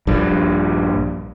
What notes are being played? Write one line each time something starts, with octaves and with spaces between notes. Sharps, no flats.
A#1 G2